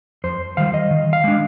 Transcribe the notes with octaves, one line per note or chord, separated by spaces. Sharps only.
F2 C5
D#3 G3 F5
D#5
D#3
F5
G#3 D4